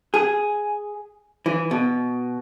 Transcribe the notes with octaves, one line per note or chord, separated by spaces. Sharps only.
G#4
E3
B2